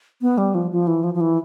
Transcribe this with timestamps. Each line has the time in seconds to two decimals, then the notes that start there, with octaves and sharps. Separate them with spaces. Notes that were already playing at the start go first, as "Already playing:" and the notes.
0.22 B3
0.38 G3
0.55 F3
0.71 F3
0.87 E3
1.04 F3
1.14 F3
1.21 E3